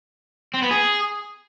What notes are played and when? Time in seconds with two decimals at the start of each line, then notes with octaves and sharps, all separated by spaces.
0.54 C4
0.62 B3
0.71 G#4